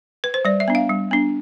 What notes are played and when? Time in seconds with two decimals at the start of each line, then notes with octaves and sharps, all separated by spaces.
0.24 B4
0.34 C5
0.45 G3 D5
0.60 E5
0.68 B3 D4
0.75 F5
0.90 G3
1.11 B3 D4